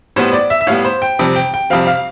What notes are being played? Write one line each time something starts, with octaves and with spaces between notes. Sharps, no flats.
A2 G3 B3 C5
D5
E5
E5
A2 G3 B3 F5
C5
G5
F2 C3 G3 C4
G5
G5
F2 C3 G3 C4 F5
F5